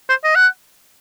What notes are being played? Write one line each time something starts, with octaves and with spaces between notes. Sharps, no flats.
C5
D#5
F#5